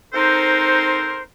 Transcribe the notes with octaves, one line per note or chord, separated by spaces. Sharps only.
C4 D#4 A4 A#4 C5